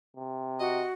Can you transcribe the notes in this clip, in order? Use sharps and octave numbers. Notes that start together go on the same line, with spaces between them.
C3
F#4 D#5